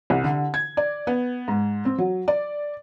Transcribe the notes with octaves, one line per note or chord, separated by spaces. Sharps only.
C2
D3
G#6
D5
B3
G#2
C4
F#3
D5